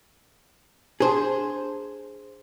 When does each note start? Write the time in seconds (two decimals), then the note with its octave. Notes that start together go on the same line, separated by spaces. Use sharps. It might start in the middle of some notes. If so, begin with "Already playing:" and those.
1.00 D4 G#4 C5 A5